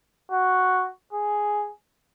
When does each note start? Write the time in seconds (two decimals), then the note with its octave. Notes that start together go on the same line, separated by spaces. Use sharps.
0.31 F#4
1.13 G#4